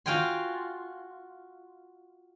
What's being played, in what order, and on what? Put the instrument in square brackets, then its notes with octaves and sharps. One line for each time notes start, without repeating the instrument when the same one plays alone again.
[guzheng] F4 F#4 F5 G5 G#5 C6